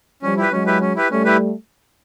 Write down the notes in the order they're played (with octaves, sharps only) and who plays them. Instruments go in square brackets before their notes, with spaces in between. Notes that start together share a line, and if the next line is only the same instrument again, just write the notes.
[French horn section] F3 G3 [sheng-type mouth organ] C#4
[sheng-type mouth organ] E4 G4 B4
[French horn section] F#3 G#3 [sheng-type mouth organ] C#4
[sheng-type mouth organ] E4 G4 B4
C#4
E4 G4 B4
[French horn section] G3 A3 [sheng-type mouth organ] C#4
[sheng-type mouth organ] E4 G4 B4